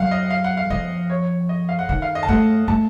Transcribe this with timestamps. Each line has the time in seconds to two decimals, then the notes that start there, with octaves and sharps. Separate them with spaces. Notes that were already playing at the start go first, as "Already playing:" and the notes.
Already playing: F#3 F5 F#5
0.11 D#5
0.30 F5
0.44 F#5
0.57 F5
0.70 F3 D#5
1.10 C#5
1.49 D#5
1.69 F5
1.79 F#5
1.89 D#3 F#5
2.02 F5
2.15 D#5
2.23 A5
2.28 A3 F#5
2.68 A3 A5